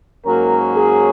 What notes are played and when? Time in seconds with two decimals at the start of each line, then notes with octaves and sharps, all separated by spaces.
0.25 G#2 F#3 A#3 C#4 A#4
0.75 G#4